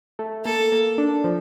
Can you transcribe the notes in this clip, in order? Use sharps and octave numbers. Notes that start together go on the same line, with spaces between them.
A3
A#3 A4
A#3
D4
F3